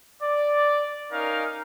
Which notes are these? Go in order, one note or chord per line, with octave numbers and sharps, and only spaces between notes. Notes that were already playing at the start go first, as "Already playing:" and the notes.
D5
C#4 D#4 A#4 F5